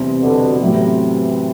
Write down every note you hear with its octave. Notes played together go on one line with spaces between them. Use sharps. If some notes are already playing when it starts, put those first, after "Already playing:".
Already playing: E2 C3 G3 C4
B2 D3
A2 C3 E3 F#3 B3